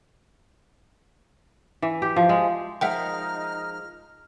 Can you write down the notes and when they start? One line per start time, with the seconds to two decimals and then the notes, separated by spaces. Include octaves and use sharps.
1.82 E3
2.02 G4
2.16 F3
2.29 G#3
2.81 F3 G#3 D#4 A#4 E5 F#5 G5 F6